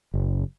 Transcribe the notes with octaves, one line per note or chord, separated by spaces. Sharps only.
F#1